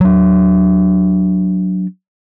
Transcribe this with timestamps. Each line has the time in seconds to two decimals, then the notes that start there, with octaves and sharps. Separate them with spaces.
0.01 F#3 D4